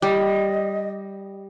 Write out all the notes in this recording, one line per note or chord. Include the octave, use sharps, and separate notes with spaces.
G3 D#5